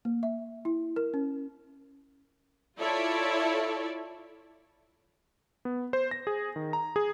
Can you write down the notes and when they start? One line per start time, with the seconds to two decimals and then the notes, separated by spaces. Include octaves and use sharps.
0.05 A#3
0.23 E5
0.65 E4
0.96 A#4
1.14 C#4
2.79 E4 F4 A4 C#5 D5 E5
5.65 B3
5.93 C5
6.11 A#6
6.27 G#4
6.56 D#3
6.73 A#5
6.96 G#4